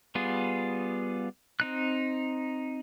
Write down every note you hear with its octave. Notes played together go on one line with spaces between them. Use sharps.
G3 B3 F4 G#4
C4 D#4 F#6